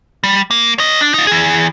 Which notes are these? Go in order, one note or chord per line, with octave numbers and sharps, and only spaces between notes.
G3
A#3
C#5 D#5
D4
D#4 F4
E3 G#4